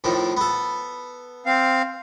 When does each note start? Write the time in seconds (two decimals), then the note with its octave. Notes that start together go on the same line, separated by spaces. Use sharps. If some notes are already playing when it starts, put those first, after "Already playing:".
0.04 F2 A2 D#3
0.37 B3 A4
1.46 C4 F5